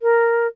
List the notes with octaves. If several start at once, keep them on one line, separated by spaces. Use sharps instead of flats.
A#4